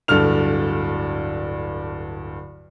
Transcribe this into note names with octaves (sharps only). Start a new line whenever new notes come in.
D1 G2 A4 F6 F7